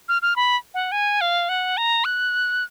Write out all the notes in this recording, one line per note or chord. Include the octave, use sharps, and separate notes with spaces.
F6
F6
B5
F#5
G#5
F5
F#5
A#5
F#6